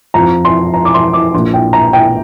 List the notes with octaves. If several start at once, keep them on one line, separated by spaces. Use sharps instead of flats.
F2 F3 C4 A#5
C6
A#5
D6
C6
D6
A#1 A#2 A#3 C6
G5
A#5
G5